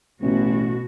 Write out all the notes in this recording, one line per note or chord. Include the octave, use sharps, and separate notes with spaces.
A1 B2 F#4